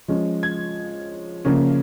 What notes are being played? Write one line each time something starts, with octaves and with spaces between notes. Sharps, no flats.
F3 G#3 C#4
G#6
C#3 F3 A#3 C#4